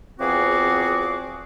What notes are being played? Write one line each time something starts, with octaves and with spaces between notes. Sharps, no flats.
E2 F3 C4 F#4 G#4 D6